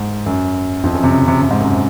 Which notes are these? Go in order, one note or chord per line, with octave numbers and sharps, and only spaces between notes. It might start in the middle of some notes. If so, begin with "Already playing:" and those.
Already playing: G#2
F#2
F2
F#2
C3
C#3
C3
C3
G#2
F#2